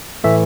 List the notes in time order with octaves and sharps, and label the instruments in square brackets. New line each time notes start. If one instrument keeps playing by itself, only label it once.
[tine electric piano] A2 E3 A3 E5